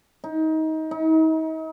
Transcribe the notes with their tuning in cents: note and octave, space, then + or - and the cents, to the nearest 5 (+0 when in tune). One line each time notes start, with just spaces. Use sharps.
D#4 +25
D#4 +40